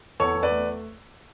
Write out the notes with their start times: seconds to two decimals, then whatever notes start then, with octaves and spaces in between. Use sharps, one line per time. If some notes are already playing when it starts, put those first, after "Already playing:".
0.20 E2 A4 C#5
0.35 E2
0.43 B4 D5
0.50 A3